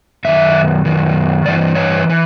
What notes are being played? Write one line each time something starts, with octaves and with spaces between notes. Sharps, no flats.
F#2 D#3 E5
F#2 D#3
G2 E3 D5
C#5
E3